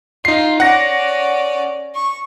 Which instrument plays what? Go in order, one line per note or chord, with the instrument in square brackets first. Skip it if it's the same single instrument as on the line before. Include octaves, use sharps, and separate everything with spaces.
[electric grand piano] D#4 C7 [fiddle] F4
[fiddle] C#4 D5 [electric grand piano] F#5 A#6
[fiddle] C#6